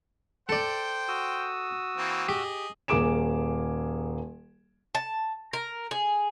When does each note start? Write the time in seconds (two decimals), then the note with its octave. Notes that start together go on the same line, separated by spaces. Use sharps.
0.49 A4 C5 D5 G5
1.08 F#4 D#6 E6
1.97 E3 A#3 C4
2.29 G4 G#4 D#5
2.88 D#1 A#3 G#4 D6 D7 E7
4.95 A5
5.53 A#4
5.91 G#4